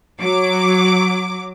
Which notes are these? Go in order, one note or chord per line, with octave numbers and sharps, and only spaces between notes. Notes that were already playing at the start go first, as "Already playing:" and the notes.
F#3 D6